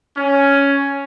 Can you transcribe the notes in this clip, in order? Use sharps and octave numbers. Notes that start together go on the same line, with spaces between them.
C#4